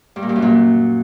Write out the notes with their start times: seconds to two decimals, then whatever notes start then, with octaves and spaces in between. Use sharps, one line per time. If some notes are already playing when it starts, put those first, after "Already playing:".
0.16 G2
0.22 A#2
0.29 G2
0.36 F#2
0.42 A#2